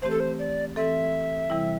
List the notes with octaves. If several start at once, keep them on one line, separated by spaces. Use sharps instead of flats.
E3 A3 C4 G4 C5
A4
C5
D5
E3 C4 A4 E5
C3 E3 G3 E4